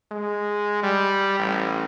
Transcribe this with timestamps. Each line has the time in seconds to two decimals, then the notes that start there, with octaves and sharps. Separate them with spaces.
0.11 G#3
0.83 G3
1.39 A1